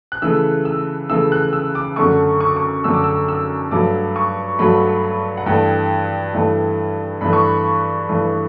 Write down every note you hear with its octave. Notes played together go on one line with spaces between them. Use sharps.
F#6
C#3 E3 A3 E6
E6
C#3 E3 A3 E6
F#6
E6
D6
F#2 D3 A3 C#6
C#6
D6
C#6
F#2 D3 A3 E6
D6
E6
E6
G2 F#3 A3 D6
C#6
G2 F#3 A3 B5
F#5
G2 E3 A3 G5
G2 E3 A3
G2 E3 A3 B5
C#6
B5
G2 E3 A3